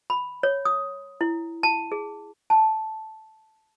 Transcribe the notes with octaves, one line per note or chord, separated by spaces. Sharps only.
B5
C#5
D#6
E4
A5
G#4
A5